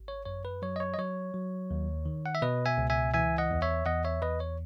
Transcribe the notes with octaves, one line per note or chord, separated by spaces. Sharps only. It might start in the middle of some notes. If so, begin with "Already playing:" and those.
Already playing: G#1
C#5
F#2 C#5
B4
F#3 C#5
D#5
C#5
D#5
F#3 C#5
F#3
D#2
D#3
F#5
E5
B2 B4 D#5
E5 G#5
C#2
E5 G#5
E3 E5 G#5
D#5 F#5
E2
C#5 E5
E2 D#5 F#5
C#5 E5
E2 B4 D#5
C#5